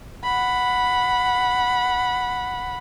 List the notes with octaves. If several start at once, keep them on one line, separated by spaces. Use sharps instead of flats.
F#5 B5